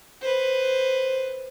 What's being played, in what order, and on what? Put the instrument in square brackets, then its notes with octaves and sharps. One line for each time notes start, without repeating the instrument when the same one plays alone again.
[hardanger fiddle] B4 C5